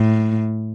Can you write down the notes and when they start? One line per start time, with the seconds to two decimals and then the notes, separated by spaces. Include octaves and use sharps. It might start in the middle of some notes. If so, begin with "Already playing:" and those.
Already playing: A2